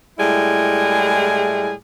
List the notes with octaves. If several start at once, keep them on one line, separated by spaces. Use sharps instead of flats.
A2 G3 G#3 E4 G#4